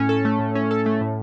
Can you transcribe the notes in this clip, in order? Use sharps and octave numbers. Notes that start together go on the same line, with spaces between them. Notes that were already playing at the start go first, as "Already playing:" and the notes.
Already playing: A2 C#4
A4
A3
A2
C#4
A4
A3
A2